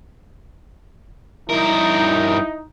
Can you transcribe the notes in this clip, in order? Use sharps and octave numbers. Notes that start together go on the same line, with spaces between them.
G2 D#4 E4 A#4